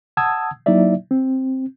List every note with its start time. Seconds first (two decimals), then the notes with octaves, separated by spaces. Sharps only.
0.17 F#5 A5 D#6 E6 G#6
0.66 F#3 A#3 D#4 E4 D5 E5
1.11 C4